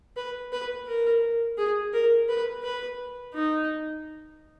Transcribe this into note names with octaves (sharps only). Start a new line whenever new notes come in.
B4
B4
A#4
G#4
A#4
B4
B4
D#4